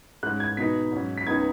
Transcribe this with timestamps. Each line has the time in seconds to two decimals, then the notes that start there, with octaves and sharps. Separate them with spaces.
0.23 G#2 G#3 C#4 F#6
0.40 G#6
0.57 B2 B3 D#4 B6
0.92 G#2 F#3 C#4
1.18 B6
1.26 C#2 C#3 B3 D#4 G#6